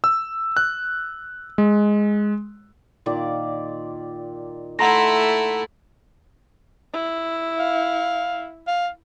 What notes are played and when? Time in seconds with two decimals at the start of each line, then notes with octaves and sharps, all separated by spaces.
0.04 E6
0.57 F#6
1.58 G#3
3.06 A#2 D#3 D5
4.79 A3 E4 F#5 A#5 C6 A#6
6.93 E4
7.59 F5
8.67 F5